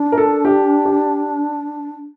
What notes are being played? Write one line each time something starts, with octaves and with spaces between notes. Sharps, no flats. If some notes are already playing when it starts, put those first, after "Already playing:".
Already playing: D4
A#4
A4
G4
G4